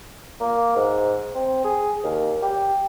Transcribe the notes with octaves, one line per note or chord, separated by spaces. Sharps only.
A#3
G#2
C4
G#4
D#2
G4